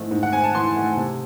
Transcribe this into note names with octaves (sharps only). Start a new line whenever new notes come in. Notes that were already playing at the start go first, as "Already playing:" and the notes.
Already playing: G#2 E3 A3 C4
G#2
F#5
C4 G#5
A5
E3 C6
A3
C3